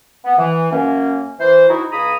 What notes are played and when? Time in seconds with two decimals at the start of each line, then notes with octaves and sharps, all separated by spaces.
0.25 B3
0.38 E3
0.72 F#2 A#3 C#4
1.40 E3 C5
1.68 D#4 E4 F#4
1.92 C#2 C#3 G#4 A#5 B5 D#6